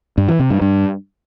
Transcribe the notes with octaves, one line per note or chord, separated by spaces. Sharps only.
G2
E3
C3
G2
G2